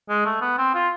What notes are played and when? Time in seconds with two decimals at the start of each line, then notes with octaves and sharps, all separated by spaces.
0.09 G#3
0.26 A3
0.41 B3
0.58 C4
0.75 F4